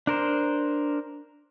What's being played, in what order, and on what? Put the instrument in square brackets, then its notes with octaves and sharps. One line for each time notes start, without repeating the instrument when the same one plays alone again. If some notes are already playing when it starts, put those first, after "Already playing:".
[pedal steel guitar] D4 A#4 C5